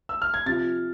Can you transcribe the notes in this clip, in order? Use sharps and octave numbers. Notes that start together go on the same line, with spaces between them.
E6
F6
G#6
C3 F3 A6